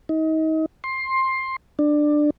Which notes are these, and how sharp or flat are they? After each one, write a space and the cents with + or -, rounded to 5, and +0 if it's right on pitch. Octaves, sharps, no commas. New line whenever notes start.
D#4 +30
C6 +15
D4 +15